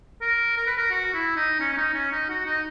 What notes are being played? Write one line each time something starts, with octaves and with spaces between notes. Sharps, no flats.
A#4
A#4
B4
A#4
F#4
E4
D#4
C#4
C#4
D#4
C#4
D#4
F#4
D#4